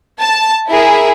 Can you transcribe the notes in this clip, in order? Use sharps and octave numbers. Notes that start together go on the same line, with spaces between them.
A5
E4 G#4 A#4 E5